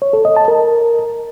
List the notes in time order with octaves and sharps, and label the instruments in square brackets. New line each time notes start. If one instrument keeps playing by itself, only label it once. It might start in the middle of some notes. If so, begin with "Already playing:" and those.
[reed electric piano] C#5
A4
D#5
A5
A#4